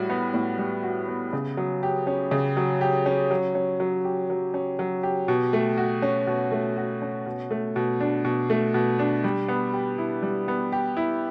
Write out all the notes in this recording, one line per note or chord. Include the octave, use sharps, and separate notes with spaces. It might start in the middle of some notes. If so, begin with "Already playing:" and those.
Already playing: A2 G3 F#4
B3
A2
G3
F#4
B3
C#3
F#3
G4
C#4
C#3
F#3
G4
C#4
F#3
C#4
F#3
G4
F#3
C#4
F#3
G4
B2
A3
F#4
C#4
B2
A3
F#4
C#4
B2
A3
B2
D4
B2
A3
B2
D4
G3
B3
G4
E4
G3
B3
G4
E4